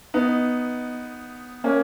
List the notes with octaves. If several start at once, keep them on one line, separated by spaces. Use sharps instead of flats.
B3 D#4
A#3 C#4